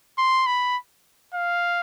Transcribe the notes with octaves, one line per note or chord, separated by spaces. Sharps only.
C6
B5
F5